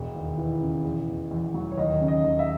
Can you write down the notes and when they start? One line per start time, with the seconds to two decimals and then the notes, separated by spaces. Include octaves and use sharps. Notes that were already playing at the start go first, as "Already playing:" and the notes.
Already playing: E1
0.14 D#2
0.38 E3
0.61 C#3
0.85 E2
1.07 B2
1.31 E2
1.54 F#3
1.71 C#5
1.77 D#2 D#5
2.01 C#3
2.08 D#5
2.24 D#2
2.39 E5